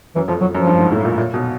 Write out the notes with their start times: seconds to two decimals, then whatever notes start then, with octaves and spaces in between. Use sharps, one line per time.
0.16 F#2 E3
0.28 F2 F3
0.41 F2 F#3
0.54 F#2 F3
0.67 G2
0.79 G#2
0.92 A2
1.05 A#2
1.18 A#2
1.34 B2